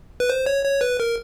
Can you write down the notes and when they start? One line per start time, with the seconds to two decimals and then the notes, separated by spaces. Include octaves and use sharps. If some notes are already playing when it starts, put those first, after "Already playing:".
0.20 B4
0.30 C5
0.46 C#5
0.65 C#5
0.81 B4
1.00 A#4